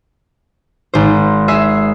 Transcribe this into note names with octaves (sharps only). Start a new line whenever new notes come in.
G#1 C5
G#4 E5 C7